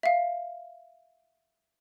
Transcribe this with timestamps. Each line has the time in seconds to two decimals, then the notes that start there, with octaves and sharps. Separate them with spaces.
0.03 E5 F5